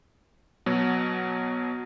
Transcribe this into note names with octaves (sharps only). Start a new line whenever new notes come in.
B2 F#3